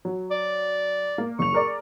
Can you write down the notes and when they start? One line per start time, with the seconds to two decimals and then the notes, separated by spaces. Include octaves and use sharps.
0.05 F#3
0.31 D5
1.18 A#3
1.39 F#1 C#6 F7
1.52 G#4 A#4 D5